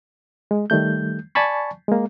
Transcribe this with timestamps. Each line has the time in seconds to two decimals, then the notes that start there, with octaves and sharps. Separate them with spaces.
0.51 G#3
0.70 D#3 G3 A3 G6
1.35 D5 G#5 A5 B5 C#6
1.88 G#3 A#3